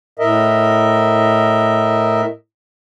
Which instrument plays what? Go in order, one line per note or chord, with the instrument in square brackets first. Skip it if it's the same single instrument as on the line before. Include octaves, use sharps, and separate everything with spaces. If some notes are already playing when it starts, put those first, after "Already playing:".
[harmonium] A2 A#4 D#5 E5